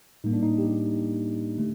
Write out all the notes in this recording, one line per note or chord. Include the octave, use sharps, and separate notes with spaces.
A2 G3 A#3 D#4
D4
D#4
G4
D3 A3